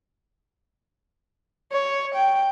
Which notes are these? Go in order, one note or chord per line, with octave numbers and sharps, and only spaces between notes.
C#5
G5